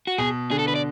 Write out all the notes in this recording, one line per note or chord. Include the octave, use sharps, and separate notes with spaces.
F#4
B2 G#4
D3 G#4
A4
D3 B4
D5